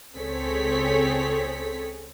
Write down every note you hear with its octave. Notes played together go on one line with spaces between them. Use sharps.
C#2 C4 G#4 A4 C#5 B6